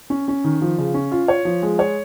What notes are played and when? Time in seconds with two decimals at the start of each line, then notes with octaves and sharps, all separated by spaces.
0.10 C#4
0.28 C#4
0.44 D#3
0.61 F3
0.78 C#3
0.94 C#4
1.11 F4
1.28 C#5
1.45 F3
1.63 G#3
1.79 C#5